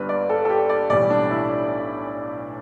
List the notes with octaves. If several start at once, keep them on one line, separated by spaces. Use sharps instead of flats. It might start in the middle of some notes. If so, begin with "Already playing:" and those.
Already playing: G1 G2 G3 B4
D5
A4
A4
G4
D5
B1 A2 E3 G3 D5
D4
E4